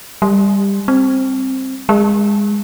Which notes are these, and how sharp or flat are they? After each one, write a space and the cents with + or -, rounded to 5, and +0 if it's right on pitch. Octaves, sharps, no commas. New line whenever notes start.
G3 +20
C4 +10
G#3 -20